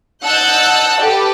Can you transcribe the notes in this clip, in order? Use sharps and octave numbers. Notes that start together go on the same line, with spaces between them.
D#5 F#5 A5 E6 F#6 G6
G4 A4 B4